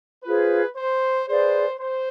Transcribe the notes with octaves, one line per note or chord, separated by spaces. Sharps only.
F4 G#4 B4 C5
C5
G#4 B4 C5 D5 F5
C5